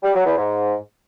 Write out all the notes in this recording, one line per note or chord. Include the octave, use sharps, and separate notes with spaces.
G3
F#3
E2
G#2